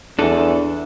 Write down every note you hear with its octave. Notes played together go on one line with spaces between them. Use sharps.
E2 D4 A4